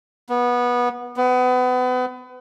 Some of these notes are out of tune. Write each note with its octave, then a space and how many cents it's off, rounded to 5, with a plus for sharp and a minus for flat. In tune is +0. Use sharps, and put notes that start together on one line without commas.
B3 -20
B3 +30